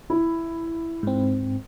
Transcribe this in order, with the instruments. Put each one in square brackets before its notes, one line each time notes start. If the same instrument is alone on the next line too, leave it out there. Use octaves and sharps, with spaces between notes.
[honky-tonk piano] E4
[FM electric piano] G#2 C4